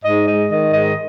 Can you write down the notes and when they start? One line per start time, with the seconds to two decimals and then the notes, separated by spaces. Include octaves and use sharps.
0.03 G#2 D#5
0.27 G#3 D#5
0.50 D#3 D#5
0.73 G#2 D#5